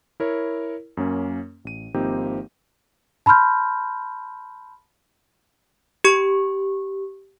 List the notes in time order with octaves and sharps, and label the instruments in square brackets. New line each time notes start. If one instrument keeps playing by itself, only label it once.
[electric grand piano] E4 A#4 C#5
F#2 A#3 C#4
A1 D#7
G#1 F3 A#3 C4 D#4 G4
[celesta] A5 B5 C6 F6 G6
[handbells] G4 C#6